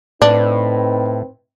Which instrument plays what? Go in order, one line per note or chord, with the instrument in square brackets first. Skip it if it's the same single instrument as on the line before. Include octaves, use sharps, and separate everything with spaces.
[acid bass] A2 [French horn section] C4 D#4 B4 [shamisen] D4